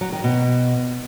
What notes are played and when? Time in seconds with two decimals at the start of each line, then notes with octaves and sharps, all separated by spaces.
0.01 F#3
0.12 D#3
0.24 B2